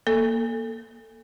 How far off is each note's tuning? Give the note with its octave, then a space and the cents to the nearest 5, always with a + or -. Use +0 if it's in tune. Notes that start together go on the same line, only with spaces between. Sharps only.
A#3 +10 A4 +5